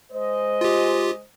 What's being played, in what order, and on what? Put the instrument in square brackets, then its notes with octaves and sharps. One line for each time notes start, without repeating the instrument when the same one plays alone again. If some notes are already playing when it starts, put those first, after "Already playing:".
[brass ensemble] G#3 C5 D#5
[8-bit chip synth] F4 G4